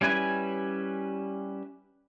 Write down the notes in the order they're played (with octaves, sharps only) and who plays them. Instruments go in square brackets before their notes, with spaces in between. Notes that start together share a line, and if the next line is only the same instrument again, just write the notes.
[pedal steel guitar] G3 C#4 E4 B4 G#5